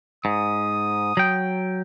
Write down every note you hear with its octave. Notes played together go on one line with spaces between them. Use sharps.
G#2 D#6
F#3 G5